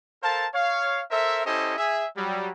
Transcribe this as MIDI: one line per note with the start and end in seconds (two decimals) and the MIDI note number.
0.23 0.47 69
0.23 0.47 70
0.23 0.47 72
0.23 0.47 77
0.23 0.47 81
0.54 1.02 73
0.54 1.02 77
1.11 1.45 69
1.11 1.45 70
1.11 1.45 72
1.11 1.45 76
1.46 1.76 61
1.46 1.76 64
1.46 1.76 67
1.46 1.76 69
1.46 1.76 72
1.46 1.76 75
1.78 2.06 68
1.78 2.06 76
2.17 2.50 54
2.17 2.50 55